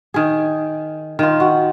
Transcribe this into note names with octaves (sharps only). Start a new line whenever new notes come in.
D#3 G#4
D#3 F4
F#4